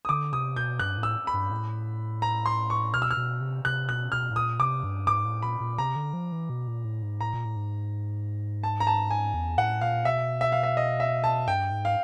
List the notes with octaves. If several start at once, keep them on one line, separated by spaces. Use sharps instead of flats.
D#6
D3 D6
C3 D#6
B2 G6
G2 F#6
A2
E6
B5
G2
A2
A#5
C6
C#6
B2 F6
E6
F6
B2
C3
C3 F#6
B2 F#6
B2 F6
A2
A#2 D#6
C3 D6
G2
G#2 D6
A2
A#2 B5
A#2
C3 A#5
D3
F3
E3
B2
A#2
A2
G#2
A2 A#5
A#2
A2
G#2
A5
A#5
A5
G#5
E2
A2 F#5
A#2 F5
B2 E5
E5
F5
E5
D#5
E5
A5
G2 G5
G#2
F5